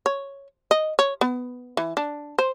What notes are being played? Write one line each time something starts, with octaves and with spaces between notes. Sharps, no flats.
C#5
D#5
C#5
B3
E3
D4
C5